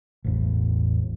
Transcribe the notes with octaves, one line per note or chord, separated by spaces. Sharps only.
E1 A1